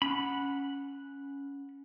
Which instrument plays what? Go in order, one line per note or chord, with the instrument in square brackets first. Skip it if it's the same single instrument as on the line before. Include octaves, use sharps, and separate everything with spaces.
[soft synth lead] C#4 [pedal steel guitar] F#5 B5